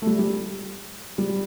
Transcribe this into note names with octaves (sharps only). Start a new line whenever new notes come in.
A3
G3
G3
G3